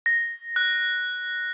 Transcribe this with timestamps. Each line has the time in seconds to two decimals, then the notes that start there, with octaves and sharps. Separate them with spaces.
0.06 A#6
0.56 F#6